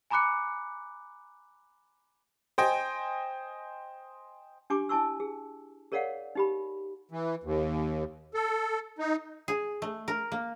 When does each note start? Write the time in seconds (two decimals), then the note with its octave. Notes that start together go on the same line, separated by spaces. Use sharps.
0.10 G#5 A#5 B5 D6 F#6 C#7
2.58 C5 D#5 G5 G#5
4.70 D4 G4 G#5 C#6 D6
4.89 E4 G#5 A5 C#6 E6
5.20 G#4
5.92 G#4 A#4 C#5 D5 F5 F#5
6.35 D#4 G4 B5
7.11 E3
7.44 D#2
8.34 A4
8.99 D#4
9.48 G#4
9.82 A3
10.08 A#4
10.32 A#3